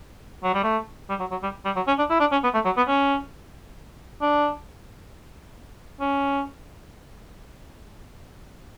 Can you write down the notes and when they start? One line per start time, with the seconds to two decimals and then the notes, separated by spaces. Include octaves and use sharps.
0.44 F#3
0.54 G3
0.64 A3
1.09 G3
1.20 F#3
1.31 F#3
1.43 G3
1.65 G3
1.76 F#3
1.87 C#4
1.99 D4
2.10 E4
2.20 D4
2.32 C#4
2.44 B3
2.54 A3
2.65 F#3
2.77 B3
2.88 C#4
4.22 D4
6.01 C#4